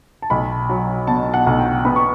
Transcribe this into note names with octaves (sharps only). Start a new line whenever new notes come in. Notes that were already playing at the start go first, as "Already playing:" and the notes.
A5
B1 B5
F#3
B2 A5
F#5
B1
G5
B3 B5
C#6